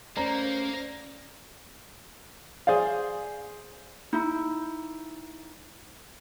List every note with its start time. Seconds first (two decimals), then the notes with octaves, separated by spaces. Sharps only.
0.17 A3 A#3 C#4 C5 D5 A#5
2.67 G#4 C5 D5 F5
4.13 D#4 E4